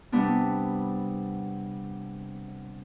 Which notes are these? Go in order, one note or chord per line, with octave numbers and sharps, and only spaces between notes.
C3 G3 B3 D4